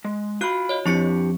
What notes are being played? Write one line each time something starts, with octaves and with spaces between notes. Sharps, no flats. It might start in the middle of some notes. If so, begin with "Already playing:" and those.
G#3
F4 F#4 B5 F#6
C#5 D#5
F2 D4 E4 G4 C#6 C#7